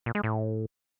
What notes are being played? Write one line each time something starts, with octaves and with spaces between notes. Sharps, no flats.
A#2
G#3
A2